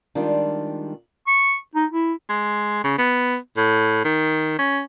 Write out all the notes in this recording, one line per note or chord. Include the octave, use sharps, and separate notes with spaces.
D#3 G3 G#3 D4 F4
C#6
D#4
E4
G#3
C#3
B3
A2
D#3
C#4